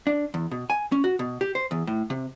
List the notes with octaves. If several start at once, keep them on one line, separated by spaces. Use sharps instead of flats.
D4
E2
B2
G#5
C#4
F#4
B2
G4
C5
E2
A2
C3